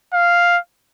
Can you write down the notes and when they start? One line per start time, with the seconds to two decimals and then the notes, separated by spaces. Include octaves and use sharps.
0.13 F5